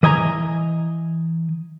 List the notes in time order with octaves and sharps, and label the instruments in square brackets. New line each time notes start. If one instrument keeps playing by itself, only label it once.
[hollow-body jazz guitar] E3 D#5 G#5 A#5